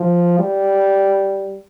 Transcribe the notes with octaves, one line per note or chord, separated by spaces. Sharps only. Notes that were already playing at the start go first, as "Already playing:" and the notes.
Already playing: F3
G3